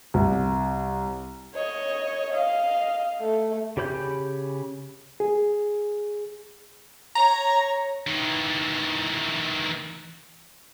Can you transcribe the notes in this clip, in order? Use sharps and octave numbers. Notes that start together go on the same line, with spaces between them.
C2
C#5 D#5
D#5 F5
A3
C#3 G4 C#5 B5 G6
G#4
C#5 A#5
D#3 E3